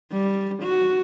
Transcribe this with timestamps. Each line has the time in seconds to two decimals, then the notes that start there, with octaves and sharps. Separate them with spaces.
0.12 G3
0.62 F#4